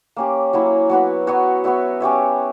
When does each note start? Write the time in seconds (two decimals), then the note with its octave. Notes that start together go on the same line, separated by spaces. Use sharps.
0.16 A#3 C#4 G4
0.53 F#3 A#3 E4
0.89 F#3 B3 F#4 B4
1.27 F#3 B3 F#4 C#5
1.64 B3 F#4 C#5 E5
2.00 C#4 G4 C#5 E5